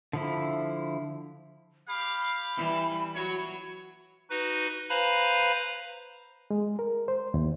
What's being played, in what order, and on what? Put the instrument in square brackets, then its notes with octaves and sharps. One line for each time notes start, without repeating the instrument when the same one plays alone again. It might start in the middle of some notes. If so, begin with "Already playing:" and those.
[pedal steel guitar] D3 F3 E4
[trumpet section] G4 F5 [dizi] B5
[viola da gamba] E3 G3
[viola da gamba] F#3 F#4 [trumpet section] C#5
[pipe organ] D#4 F#4 B4
B4 C5 F5 G#5 A#5 B5
[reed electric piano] G#3
A#4
C5
D#2